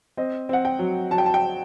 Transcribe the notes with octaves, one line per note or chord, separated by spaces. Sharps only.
C4 D#5
C4 F#5
G5
F#3
F#3 A5
G5
A5
G5